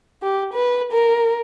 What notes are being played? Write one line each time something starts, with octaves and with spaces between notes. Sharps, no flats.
G4
B4
A#4